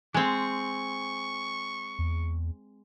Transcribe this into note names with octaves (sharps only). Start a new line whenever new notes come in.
G#3 C4 C#6
E2